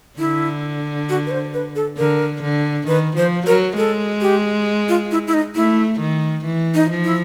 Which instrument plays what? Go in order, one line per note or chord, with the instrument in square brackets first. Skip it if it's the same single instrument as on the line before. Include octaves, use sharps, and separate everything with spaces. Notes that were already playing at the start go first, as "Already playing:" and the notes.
[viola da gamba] D3 [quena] E4
[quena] F#4
B4
C5
B4
A4
[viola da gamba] D3 [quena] A#4
[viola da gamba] D3
[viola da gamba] D#3 [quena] B4
[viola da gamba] F3 [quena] C5
[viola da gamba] F#3 [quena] A#4
[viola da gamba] G#3 [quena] A4
[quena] G4
F4
E4
E4
D#4
[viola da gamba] A3 [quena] E4
[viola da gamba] D#3
E3
[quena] D#4
[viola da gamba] F3
[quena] E4